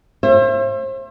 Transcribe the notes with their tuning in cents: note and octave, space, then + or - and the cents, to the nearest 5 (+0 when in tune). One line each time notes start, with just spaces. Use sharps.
C5 +40 E5 +35